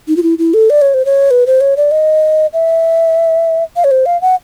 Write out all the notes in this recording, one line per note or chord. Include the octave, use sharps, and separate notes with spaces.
D#4
F4
E4
E4
A4
D5
C#5
C5
C#5
B4
C5
C#5
D5
D#5
E5
F5
C#5
C5
F5
F#5